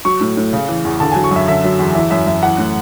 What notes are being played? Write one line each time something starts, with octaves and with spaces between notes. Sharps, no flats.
F#3 C#6
A2
A2
C#3
E3
E2
D3 A5
F#3 G#5
C#6
F#2 E5
D3 E5
F#3
E2
E3 E5
F#2 E5
F#2 E5
E3 F#5
A2